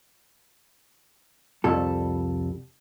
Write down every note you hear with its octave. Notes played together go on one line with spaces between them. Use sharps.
C2 F2 G3 A4